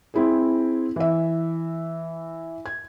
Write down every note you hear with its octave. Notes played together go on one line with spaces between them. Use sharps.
C4 E4 G#4
E3 E5
G#6